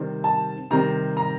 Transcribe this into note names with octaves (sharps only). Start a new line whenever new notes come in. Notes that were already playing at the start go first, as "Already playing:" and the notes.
Already playing: C3 D#3 G3 C4
A5
C3 D#3 G3 C4 A#5
A#5